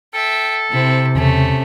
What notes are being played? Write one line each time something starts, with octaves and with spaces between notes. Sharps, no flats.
A4 E5 G5
C3 C4 E4
E2 C#3 A3 C#4